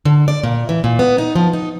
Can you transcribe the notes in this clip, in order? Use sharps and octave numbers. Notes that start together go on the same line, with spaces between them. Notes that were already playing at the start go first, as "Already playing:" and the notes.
D3
D5
A#2
E3
A#2
B3
D#4
F3
D#4